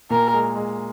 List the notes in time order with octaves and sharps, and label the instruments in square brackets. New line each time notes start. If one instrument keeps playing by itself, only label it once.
[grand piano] A#2 [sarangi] A#4
[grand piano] G#3
G#3